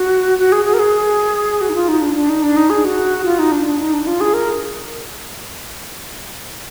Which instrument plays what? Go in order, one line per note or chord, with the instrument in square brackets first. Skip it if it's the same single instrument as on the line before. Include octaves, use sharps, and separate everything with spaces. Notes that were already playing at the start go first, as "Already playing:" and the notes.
Already playing: [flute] F#4
F#4
G#4
G#4
A#4
G#4
F#4
D#4
F4
D#4
D4
D4
D#4
D4
D#4
G#4
F#4
F4
D#4
D4
D4
D#4
D4
F4
G#4
A#4